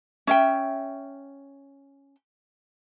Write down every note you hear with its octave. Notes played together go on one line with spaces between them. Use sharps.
C#4 E5 G5